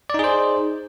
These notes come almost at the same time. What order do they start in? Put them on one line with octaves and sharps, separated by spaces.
D5 D#4 G#4 C5